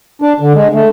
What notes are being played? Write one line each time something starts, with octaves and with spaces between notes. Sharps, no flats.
D4
D3
G#3
A3